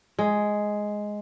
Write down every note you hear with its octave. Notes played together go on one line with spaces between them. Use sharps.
G#3